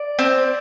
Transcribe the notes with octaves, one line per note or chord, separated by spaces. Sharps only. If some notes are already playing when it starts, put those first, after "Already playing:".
Already playing: D5
C4